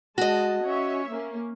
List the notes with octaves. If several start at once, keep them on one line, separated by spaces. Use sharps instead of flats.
G#3 F#4 D#5 A5
C#4 C#5 E5
A#3 C#4